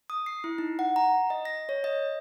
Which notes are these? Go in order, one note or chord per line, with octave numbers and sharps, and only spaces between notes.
D#6
C7
E4
D#4
F#5
A#5
D#5
A#6
C#5
D#5